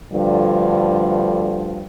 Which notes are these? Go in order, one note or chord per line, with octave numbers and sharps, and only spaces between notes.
D2 G2 D3 F3 G3